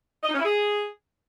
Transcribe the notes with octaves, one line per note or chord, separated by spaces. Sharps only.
D#5
D#4
C#4
E4
G#4